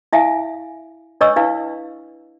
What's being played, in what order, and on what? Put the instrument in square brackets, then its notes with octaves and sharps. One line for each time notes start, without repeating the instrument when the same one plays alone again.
[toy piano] E4 E5 F5 G#5
D4 B4 C#5 D#5 C#6 E6
D4 E4 B4 F5